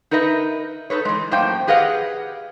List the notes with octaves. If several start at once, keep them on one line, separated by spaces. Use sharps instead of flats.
D#4 A#4 B4 D#5 E5
D#4 A4 B4 C#5
E3 G#3
F#2 A2 A#3 C5 G5
G4 G#4 B4 D#5 F5 F#5